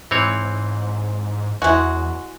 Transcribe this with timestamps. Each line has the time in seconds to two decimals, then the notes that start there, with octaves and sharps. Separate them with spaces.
0.11 G#2 E3 C4 C#5
1.62 E2 G#3 E4 F#4 E5 G#5